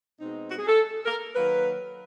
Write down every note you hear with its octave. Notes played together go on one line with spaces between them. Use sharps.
B2 G#3 C4 D#4
F#4
G#4
A4
A#4
D#3 F#3 A#3 B4